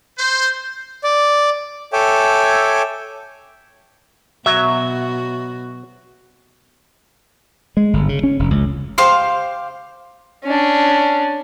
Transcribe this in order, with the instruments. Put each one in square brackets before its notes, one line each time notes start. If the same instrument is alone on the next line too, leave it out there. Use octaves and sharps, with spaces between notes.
[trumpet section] C5
[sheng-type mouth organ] D5
A4 C#5 E5 G5 G#5 D6
[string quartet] B2 F#4 [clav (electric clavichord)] F#3 [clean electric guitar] E5
[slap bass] G#3
G1
C#3
C#4
F1
C#2
[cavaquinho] G4 C5 F5 C6
[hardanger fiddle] C#4 D4